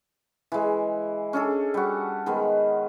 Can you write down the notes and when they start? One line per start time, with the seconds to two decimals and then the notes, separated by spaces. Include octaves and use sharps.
0.52 E3 G#3
1.33 C#4 D4 G#4 A4
1.74 G3 F#4
2.26 D#3 G#3 B3